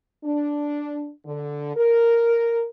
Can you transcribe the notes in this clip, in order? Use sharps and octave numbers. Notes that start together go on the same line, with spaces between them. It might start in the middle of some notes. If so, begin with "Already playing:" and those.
D4
D3
A#4